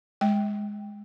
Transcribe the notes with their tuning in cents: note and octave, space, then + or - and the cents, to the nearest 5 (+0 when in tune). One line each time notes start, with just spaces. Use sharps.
G#3 +0 G5 +0